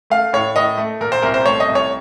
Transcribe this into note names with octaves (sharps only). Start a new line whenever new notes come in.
A3 F5
A2 C#5
A2 D#5
A3
A#2 A#4
C5
C2 A#4
C5
A3 C#5
D#5
C2
C#5